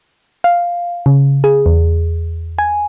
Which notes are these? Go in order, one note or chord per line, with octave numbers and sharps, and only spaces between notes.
F5
C#3
G#4
E2
G#5